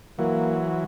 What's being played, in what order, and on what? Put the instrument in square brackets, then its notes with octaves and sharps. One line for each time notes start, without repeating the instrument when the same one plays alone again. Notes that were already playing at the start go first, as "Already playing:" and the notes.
[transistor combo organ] E3 F#3 [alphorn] A#3